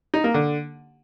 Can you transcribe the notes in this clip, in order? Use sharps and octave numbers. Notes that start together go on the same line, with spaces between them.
D#4
A#3
D3